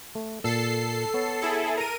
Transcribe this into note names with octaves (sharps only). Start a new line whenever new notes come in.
A3
A#2 A4 C7
B3 C#5
E4 G#4 A4
A#4 D#7